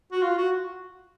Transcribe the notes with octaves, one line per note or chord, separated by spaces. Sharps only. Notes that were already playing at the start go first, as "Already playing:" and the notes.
F#4
F4
F#4